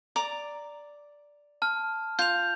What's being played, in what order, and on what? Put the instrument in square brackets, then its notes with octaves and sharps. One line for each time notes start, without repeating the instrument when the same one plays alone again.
[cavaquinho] D5 A#5 D6
[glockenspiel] A5 F6
[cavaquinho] F4 [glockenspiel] G6 F7